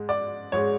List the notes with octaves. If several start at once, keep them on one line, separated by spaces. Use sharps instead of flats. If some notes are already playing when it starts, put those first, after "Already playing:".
Already playing: G#2 G#3
D5
G#2 G#3 C#5